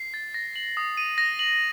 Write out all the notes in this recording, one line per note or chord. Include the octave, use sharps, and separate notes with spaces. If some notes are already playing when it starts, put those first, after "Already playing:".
Already playing: C7
A6
A#6
F#7
D#6
D#7
A#6
F#7